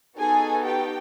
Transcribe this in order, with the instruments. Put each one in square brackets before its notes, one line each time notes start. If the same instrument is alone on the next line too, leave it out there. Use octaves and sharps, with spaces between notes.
[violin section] B3 D#4 F#4 G#4 A4 G#5
G4 G5